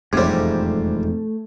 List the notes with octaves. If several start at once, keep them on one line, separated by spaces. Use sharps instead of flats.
E1 F2 G#2 C3 G3 A3 C5 G#6